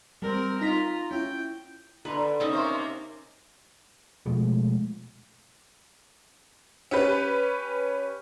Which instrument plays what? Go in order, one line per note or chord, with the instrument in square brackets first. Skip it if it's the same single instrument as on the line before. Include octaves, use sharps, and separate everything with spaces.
[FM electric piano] G3 [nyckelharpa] C4 A#4
[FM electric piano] D#4 B6 [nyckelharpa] F4 A#5
[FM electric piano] C#4 E4 [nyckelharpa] G5
[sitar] D3 [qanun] B4 [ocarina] A#5
[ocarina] D5
[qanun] C4 C#4 D#4
[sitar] C3 A#3 C5 [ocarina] E5
[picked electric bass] B2 F3 G#3 A3
[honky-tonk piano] C#4 G4 B4